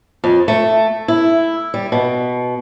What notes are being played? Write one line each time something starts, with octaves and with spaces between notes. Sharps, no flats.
F2
A3
E4
G3
B2